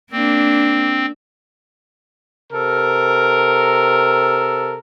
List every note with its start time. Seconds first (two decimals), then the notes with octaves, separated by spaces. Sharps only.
0.12 A#3 C4 D4
2.53 C3 A4 A#4